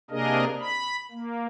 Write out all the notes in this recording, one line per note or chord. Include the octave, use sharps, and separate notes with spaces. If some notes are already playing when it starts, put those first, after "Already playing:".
C3 A#3 D4 G#4 A#4 D#5
B5
A#3